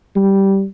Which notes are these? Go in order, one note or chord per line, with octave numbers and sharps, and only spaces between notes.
G3